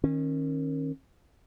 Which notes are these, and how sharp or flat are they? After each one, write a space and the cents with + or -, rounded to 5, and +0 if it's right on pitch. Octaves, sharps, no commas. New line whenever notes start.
D#3 +0 C#4 -30